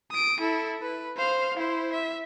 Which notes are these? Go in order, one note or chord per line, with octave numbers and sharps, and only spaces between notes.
D#6 D7
E4 A4
B4
C5 F5
E4 C5
E5